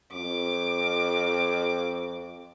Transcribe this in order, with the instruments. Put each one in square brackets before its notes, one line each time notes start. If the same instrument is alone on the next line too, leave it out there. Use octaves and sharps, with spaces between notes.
[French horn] F2 [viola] D6